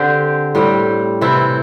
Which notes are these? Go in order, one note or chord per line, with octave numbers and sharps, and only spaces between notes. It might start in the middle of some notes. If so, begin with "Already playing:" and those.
Already playing: D3 C4 G4
A2 G3 C4
C3 E3 C4 E4